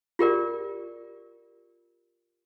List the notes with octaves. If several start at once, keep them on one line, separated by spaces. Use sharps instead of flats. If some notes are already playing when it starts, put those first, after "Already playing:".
F4 G4 A#4 D5